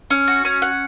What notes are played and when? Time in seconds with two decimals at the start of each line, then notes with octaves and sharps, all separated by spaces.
0.10 C#4
0.28 F#4
0.45 C#4
0.62 F#5